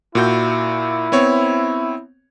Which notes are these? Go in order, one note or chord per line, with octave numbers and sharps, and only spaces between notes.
A#2 E4 F#4 G6
B3 C4 C#5